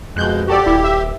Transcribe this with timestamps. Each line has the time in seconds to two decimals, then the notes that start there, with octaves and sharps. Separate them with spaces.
0.16 F2 B2 G#3 F#6 G6
0.47 F#4 G4 A4 D5
0.66 D#1 E4
0.84 E5